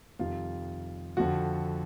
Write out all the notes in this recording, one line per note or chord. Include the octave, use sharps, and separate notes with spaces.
F2 C3 D#3 G3 F4
F2 D3 F3 F#4